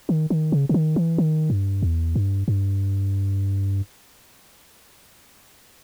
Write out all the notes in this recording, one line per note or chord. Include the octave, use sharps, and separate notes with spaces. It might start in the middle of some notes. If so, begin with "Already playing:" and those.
D#3
D#3
C#3
C#3
D#3
E3
D#3
G2
E2
G2
G2